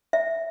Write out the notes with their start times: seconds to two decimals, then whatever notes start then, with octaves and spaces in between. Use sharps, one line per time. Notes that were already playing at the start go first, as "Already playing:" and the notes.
0.13 E5